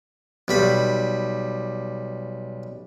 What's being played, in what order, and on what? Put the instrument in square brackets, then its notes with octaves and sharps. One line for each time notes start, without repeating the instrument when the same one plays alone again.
[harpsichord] B1 G3 B5